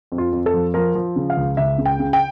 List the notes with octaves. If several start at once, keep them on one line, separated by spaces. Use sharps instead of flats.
F2
F4
F2
A4
F3
F3 A#4
F3
C#3
F5
C#2
C#2 E5
C#3
G5
C#3
G5